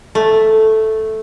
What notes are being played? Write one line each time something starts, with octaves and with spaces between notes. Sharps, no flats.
A3